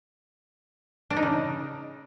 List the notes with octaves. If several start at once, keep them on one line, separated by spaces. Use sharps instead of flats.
D4
D#4
C#3